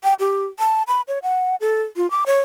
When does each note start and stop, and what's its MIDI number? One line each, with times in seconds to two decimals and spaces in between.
0.03 0.14 79
0.19 0.46 67
0.59 0.83 81
0.87 1.01 83
1.08 1.19 73
1.23 1.55 78
1.61 1.82 69
1.96 2.09 65
2.11 2.24 86
2.26 2.41 73